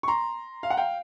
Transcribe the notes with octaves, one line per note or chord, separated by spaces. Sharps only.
C#6
A#5 C6
F5
F#5
F5 G5